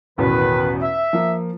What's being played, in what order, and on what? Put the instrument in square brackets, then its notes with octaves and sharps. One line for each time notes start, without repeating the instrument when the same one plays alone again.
[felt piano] A1 E2 B2 [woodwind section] D#3 B4
[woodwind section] E5
[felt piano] F3 A#3